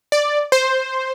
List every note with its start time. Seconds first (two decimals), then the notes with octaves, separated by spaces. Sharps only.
0.12 D5
0.52 C5